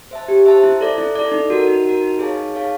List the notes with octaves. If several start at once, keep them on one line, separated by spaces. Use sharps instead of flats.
C5 E5 A5
G4
C5 E5 A5
E4
A4 D5
E4
A4 D5
D#4
F#4 A#4
D#4
F#4 A#4
D#4
G#4 C#5 F5 A5
D#4
G#4 C#5 F5 A5